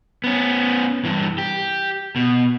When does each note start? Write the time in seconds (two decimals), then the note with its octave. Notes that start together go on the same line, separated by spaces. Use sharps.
0.24 B3 C#4
1.05 G2 E3
1.38 G4
2.16 B2